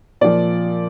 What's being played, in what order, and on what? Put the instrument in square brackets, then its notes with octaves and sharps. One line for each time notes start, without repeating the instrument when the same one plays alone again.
[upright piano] A#2 F3 D5